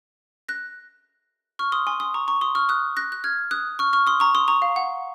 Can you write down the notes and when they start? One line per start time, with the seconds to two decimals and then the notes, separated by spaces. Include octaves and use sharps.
0.48 F#6 A#6
1.59 C#6 F6
1.72 C6 D#6
1.87 G#5 C6
2.00 C6 D#6
2.14 A#5 C#6
2.28 A#5 C#6
2.41 C6 D#6
2.55 C#6 F6
2.69 D#6 F#6
2.97 F#6 A#6
3.12 F#6
3.24 F6 G#6
3.51 D#6 F#6
3.79 C#6 F6
3.93 C#6 F6
4.07 C6 D#6
4.20 A#5 C#6
4.35 C6 D#6
4.48 A#5 C#6
4.62 F5
4.76 F#5